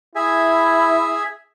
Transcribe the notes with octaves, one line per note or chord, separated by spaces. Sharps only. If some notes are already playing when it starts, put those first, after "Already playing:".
E4 G#4 E5 G#5